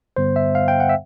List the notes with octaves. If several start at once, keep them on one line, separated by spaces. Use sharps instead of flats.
G2 D3 G3 B3 C5
E5
F5
G5
F#5
E5